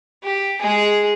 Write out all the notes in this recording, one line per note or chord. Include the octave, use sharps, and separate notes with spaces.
G4
G#3 G#4